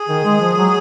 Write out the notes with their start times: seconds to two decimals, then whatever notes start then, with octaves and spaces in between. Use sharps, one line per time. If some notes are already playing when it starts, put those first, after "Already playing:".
Already playing: G#4
0.09 D#3
0.25 G#3
0.41 F3
0.58 F#3